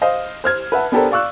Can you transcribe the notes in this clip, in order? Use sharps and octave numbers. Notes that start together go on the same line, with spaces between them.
C5 D#5 F5
C5 F6 G#6
B4 E5 F#5 A5
B3 D4 G4 A4 A#4 C5
D5 F5 C#6 E6 F#6